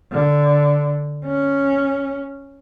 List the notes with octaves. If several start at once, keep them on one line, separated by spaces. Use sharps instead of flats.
D3
C#4